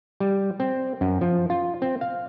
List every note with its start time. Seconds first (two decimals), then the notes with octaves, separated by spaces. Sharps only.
0.20 G3
0.60 C4
1.01 F#2
1.21 F3
1.50 F4
1.82 C4
2.01 F5